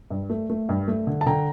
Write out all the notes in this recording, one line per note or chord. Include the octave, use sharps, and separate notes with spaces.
G2
A3
A3
G2
A3
D3
A5
D3 G5 A#5